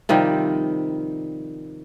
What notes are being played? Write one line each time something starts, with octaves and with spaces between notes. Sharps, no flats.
C3 D#3 F3 G3